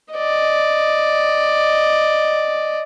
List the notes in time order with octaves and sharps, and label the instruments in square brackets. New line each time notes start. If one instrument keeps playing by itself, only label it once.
[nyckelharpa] D5 D#5